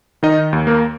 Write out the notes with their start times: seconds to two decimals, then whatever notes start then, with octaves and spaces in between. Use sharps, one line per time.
0.23 D#3 D#4 D#5
0.53 D#2
0.67 A#3 A#4